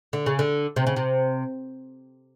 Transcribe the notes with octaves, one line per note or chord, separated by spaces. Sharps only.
D3
C#3
D3
C3
C#3
C3